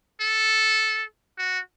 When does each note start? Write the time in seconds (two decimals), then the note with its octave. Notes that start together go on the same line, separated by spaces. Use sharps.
0.21 A4
1.38 F#4